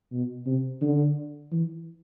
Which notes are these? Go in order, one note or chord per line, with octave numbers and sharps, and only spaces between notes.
B2
C3
D3
E3